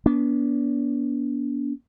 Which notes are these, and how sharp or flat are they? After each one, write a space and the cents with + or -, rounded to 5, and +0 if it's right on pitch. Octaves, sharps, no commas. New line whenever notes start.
B3 -35 D4 -40